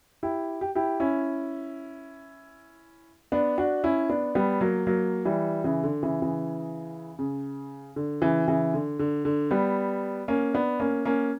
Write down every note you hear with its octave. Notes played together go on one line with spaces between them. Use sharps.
E4 G4
G4
E4 G4
C#4 E4
B3 D4
D4 F#4
C#4 E4
B3 D4
G3 B3
F#3 A#3
F#3 A#3
E3 G3
C#3 E3
D3
C#3 E3
C#3 E3
C#3
D3
C#3 E3
C#3 E3
D3
D3
D3
G3 B3
A#3 C#4
B3 D4
A#3 C#4
A#3 C#4